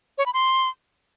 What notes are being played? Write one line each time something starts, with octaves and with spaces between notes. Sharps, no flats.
C#5
B5
C6